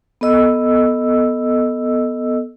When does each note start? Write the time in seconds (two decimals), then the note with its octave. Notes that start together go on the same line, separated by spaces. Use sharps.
0.21 B3 A4 D#5 E6